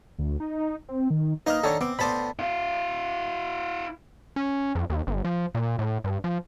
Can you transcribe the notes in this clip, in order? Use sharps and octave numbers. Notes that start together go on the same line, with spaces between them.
D2
D#4
C4
D#3
A#3 D#4 B4 D#5 F6
D3 D#3 D#4 A4 C#5
B3 C4 D6
A2 B3 C5 D5 A5 B5
E4 F5
C#4
F2
D#2
G1
F3
A#2
A2
G2
F3